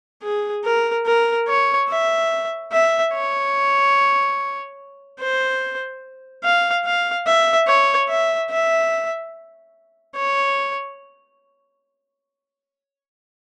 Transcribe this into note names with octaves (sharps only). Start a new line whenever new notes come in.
G#4
A#4
A#4
C#5
E5
E5
C#5
C5
F5
F5
E5
C#5
E5
E5
C#5